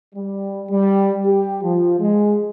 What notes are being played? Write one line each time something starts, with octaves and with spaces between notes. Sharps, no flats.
G3
G3
G4
F3
G#3